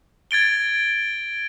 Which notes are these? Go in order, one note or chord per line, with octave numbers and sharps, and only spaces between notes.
G#6 A6 D7 G7